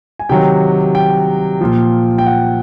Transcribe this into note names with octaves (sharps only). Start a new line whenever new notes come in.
G#5
C3 D#3 F#3 G5
G5
A#2 F3
G5
F#5